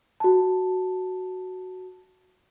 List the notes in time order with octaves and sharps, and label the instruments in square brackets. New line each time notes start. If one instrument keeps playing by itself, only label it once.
[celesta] F#4 A5